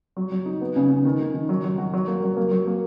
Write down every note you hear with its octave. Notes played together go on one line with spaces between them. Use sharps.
F#3
F#3
D#4
B3
C#3
C#3
D#3
D#3
D#3
F#3
F#3
F#4
F#3
A#3
F#3
A#3
F#3
A#3